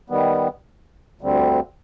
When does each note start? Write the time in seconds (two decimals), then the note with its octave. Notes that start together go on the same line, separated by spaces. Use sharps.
0.10 D#3 G3 B3
1.21 D2 D3 G3 C4